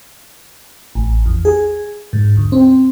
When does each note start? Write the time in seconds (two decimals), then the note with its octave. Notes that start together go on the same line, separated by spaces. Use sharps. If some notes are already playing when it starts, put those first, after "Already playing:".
0.95 A1
1.26 E2
1.45 G#4
2.13 G#2
2.37 D2
2.52 C4